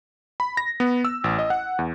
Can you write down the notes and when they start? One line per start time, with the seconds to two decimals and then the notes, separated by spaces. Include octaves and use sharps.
0.40 B5
0.57 A#6
0.80 B3
1.05 E6
1.24 A1
1.39 D#5
1.50 F#5
1.79 E2